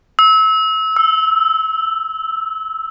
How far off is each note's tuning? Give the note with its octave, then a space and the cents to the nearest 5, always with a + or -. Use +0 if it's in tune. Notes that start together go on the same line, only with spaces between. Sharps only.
E6 -30
E6 +0